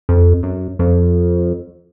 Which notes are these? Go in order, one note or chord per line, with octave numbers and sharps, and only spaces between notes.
F2
F#2
F2